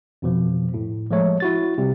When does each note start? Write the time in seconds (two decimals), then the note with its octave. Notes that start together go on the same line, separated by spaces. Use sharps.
0.22 F2 B2 F3
0.74 A2
1.11 F3 G#3 A3 C#5
1.40 E4 F#4 A6
1.78 C3 G3